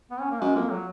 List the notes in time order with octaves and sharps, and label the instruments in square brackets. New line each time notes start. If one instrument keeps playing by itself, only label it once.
[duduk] B3
C#4
A#3
[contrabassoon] F#2 [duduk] G#3
[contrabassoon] F2 [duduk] A#3
[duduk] F#3